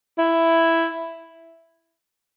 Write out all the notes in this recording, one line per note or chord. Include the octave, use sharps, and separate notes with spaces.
E4